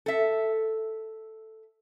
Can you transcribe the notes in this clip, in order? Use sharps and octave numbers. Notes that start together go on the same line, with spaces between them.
A4 E5